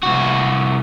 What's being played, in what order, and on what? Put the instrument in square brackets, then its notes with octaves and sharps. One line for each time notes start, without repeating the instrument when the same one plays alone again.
[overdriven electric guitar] C2 F#4